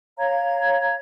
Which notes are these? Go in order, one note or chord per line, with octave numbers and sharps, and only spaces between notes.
C#5 F5 A#5 G#6